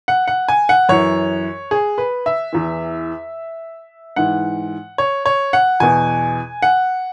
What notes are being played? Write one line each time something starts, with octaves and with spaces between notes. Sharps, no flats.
F#5
F#5
G#5
F#5
F#2 E3 C#5
G#4
B4
E5
E2 E3
G#2 E3 F#5
C#5
C#5
F#5
E2 B2 G#5
F#5